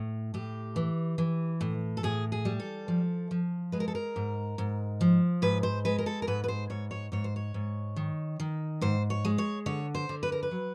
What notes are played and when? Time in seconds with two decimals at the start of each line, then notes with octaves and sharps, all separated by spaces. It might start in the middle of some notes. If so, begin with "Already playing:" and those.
Already playing: A2
0.34 A2 G4
0.76 E3
1.18 E3
1.61 A2
1.97 A4
2.03 A2 G#4
2.32 G#4
2.45 G3
2.60 A4
2.88 F3
3.31 F3
3.72 G#3 B4
3.80 A#4
3.88 A4
3.95 A#4
4.16 G#2
4.58 G#2
5.01 F3
5.42 G#2 B4
5.63 C5
5.85 G#3 B4
5.98 A#4
6.06 A4
6.22 A#4
6.27 G#2 B4
6.44 B4
6.48 C5
6.70 G#2 C#5
6.91 C#5
7.12 G#2 C#5
7.24 C5
7.36 C#5
7.54 G#2
7.96 D#3
8.40 D#3
8.81 G#2 C5
9.10 C#5
9.25 G#3
9.38 C#5
9.66 D3 C#5
9.95 C5
10.09 D3
10.23 B4
10.32 A#4
10.43 B4
10.51 F#3